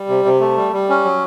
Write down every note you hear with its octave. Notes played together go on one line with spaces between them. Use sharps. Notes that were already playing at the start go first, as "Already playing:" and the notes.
Already playing: G3
C3
C3
A3
G3
G3
C#4
F#3